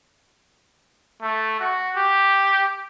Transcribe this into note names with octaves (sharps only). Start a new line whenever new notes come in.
A3
F#4
G4